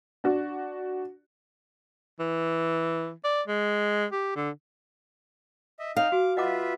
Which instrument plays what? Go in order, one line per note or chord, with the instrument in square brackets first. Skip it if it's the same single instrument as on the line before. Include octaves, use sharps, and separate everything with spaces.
[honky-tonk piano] D4 F#4
[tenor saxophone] E3
D5
G#3
G4
D3
[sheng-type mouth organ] D#5 E5
[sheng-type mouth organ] D#4 D#5 G5 [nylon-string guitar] F5
[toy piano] F#4 [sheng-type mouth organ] D6
[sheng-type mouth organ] F4 B4 E5 [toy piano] D#5 F#5 D6